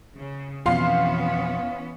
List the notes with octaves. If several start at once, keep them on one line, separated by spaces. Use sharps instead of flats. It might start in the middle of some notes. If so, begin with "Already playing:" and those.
C#3
F2 B2 E3 B3 C#4 F4 F5 C6